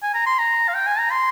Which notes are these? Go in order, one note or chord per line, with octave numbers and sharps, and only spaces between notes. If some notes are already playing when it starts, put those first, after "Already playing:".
G#5
A#5
C6
A#5
F5
G5
G#5
A#5
C6